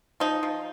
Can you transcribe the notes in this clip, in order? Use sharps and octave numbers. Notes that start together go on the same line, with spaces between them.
F3 D#4
F3